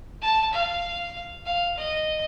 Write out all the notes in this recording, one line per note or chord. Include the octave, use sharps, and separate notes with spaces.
A5
F5
F5
D#5